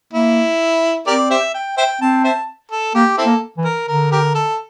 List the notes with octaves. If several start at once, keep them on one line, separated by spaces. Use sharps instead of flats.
A#3 E4
C4 G4 A#4 D5
G4 C5 E5
G5
C5 E5 G5
C4 A5
C5 E5 A5
A4
A#3 G4
C4 E4 A4
A#3
E3
A#4
D3 A#4
G4 A#4
A4